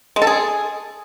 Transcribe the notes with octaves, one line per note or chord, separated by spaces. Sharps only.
G#3
A4
G#4